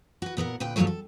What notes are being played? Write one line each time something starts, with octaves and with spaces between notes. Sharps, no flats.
F#4 B4
A#2 B3 A#4 F#5
D2 A#2 B4 G5
E2 G2 F3 F#3 A3 C#5
A4